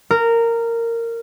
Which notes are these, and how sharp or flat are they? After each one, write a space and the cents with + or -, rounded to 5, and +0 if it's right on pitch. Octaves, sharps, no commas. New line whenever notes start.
A#4 -15